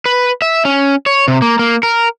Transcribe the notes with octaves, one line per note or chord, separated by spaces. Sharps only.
B4
E5
C#4
C#5
C3
A#3
A#3
A#4